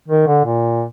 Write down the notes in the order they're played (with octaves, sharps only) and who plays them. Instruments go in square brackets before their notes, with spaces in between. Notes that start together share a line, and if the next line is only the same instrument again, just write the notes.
[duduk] D#3
D3
A#2